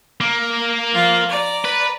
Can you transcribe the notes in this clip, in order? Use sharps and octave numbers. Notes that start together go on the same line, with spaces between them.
A#3
F3 F4
D5 A#5
B4